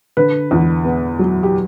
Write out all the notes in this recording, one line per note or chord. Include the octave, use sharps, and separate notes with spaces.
D3 B4
E2
B3
F#3
G4